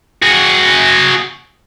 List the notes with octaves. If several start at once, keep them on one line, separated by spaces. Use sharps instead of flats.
F#4 G#4